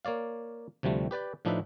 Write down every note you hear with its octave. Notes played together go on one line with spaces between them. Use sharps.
A#3 C#5 D5 F5
D2 C3 F3 G3 A3
G4 B4 D5 G5
A2 F3 D4 D#4 B4 E5